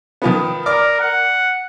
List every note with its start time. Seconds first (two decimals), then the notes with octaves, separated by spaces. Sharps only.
0.22 D#3 F3 B3
0.66 A#4 D5 D6 F6
1.00 F#5